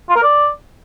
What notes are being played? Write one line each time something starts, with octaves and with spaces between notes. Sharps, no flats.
F4
A#4
D5